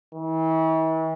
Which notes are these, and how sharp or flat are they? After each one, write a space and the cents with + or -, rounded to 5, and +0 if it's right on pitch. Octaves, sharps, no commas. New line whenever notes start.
E3 -40